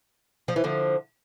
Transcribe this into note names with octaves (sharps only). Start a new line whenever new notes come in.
F3
E3
D3 F3